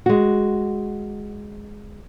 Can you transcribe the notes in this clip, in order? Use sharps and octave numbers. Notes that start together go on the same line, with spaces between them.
G#3 F#4